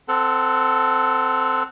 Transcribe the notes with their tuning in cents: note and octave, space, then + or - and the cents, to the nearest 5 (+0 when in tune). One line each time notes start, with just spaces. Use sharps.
C4 -10 A4 +10 F#5 +5